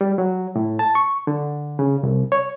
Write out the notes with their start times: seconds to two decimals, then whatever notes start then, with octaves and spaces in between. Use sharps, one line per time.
0.01 G3
0.18 F#3
0.56 A2
0.79 A5
0.95 C#6
1.27 D3
1.79 C#3
2.03 C2
2.32 C#5